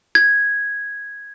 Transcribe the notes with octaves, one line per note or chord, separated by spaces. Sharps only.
G#6